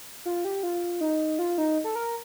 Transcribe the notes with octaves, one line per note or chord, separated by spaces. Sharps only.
F4
G4
F4
D#4
F4
D#4
A4
A#4